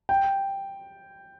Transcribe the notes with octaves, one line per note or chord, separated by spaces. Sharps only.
G5